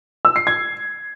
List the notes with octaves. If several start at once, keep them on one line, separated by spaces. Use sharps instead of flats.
E6
C7
G#6